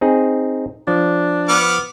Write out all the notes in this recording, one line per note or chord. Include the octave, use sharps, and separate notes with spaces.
C4 D#4 G#4
F3 D4
B3 D6 F6